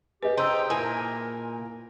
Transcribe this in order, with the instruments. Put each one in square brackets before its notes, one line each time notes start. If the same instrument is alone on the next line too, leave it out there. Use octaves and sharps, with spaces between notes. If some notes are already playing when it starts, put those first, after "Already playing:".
[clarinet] G4 [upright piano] G#4 D#5 [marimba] B4
[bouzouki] D#4 [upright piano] C5 [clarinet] G5 [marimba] C6 E6
[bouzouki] A#2 G#5 [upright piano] E4 [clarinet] A#4